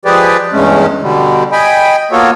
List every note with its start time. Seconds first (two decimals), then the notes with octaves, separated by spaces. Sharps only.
0.05 F3 G#3 G4 G#4 B4 D5
0.53 E2 G2 G#3 A3 C#4
1.02 B2 D3 G3
1.52 D#5 G5 G#5 B5
2.12 A#3 B3 F4 F#4 A4 C#5